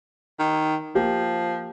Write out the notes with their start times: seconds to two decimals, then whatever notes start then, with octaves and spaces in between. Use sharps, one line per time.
0.39 D#3
0.95 F3 A#3 G4